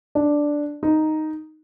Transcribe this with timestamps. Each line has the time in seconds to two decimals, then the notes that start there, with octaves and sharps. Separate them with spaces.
0.15 D4
0.83 D#4